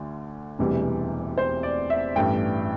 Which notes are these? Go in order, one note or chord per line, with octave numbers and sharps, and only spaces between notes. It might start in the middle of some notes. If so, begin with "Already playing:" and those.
Already playing: D2 D3
E1 D2 C3 E3 G3
C5
D5
E5
A1 G2 E3 A3 G5